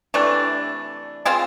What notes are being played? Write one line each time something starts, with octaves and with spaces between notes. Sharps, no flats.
C3 E3 A3 D4
C4 F4 G#4